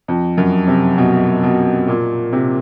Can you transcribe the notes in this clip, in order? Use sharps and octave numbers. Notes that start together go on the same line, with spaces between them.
F2
F#2
C3
B2
B2
A#2
C3